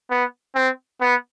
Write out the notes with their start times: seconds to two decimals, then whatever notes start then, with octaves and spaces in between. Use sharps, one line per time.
0.11 B3
0.55 C4
1.01 B3